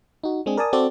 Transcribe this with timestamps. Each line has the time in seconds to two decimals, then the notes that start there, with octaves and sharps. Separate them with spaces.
0.23 D#4 F#4
0.46 G#3 C4 D4 G#4
0.57 A#4 D5 G#5 A5 D#6
0.73 C4 F#4 A4 D5